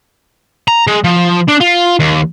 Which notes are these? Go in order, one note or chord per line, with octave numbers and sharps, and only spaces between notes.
A#5
G#3
F3
D4
F4
D#2